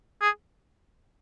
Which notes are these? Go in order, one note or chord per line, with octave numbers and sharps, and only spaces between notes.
G#4